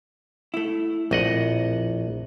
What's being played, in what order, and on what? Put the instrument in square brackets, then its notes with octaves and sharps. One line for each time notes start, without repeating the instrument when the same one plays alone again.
[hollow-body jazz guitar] A3 E4
[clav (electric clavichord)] A#1 D#5 F#5 [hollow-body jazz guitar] F2 A2